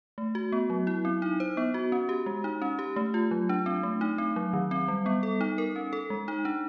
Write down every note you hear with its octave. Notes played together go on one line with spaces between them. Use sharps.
A3
F#4
B3
F#3
E4
C4
D#4
C5
B3
F#4
C#4
G4
G#3
D#4
C#4
G4
A3
F4
F#3
D4
C4
A3
D#4
C4
F#3
D#3
C4
G3
B3
A4
D#4
A#4
C#4
A4
G#3
D#4
D4